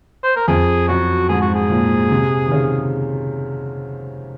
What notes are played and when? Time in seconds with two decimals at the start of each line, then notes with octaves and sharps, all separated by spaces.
0.23 C5
0.36 A#4
0.48 F2 G#4
0.88 F#2 F#4
1.29 G#2 G#4
1.41 F#4
1.54 G#4
1.70 A#2
2.11 C3
2.46 D#3
2.51 C#3